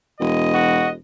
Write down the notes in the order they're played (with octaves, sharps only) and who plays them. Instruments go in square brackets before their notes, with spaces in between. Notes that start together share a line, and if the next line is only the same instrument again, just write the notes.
[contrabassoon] E1 [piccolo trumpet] D#5
[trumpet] F#4